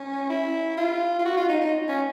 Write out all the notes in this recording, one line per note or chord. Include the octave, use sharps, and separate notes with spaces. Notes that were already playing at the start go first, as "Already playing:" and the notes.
Already playing: C#4
E4
F4
F4
F#4
F4
D#4
D#4
C#4